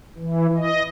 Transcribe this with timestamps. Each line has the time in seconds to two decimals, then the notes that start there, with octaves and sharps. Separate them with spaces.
0.18 E3
0.57 D#5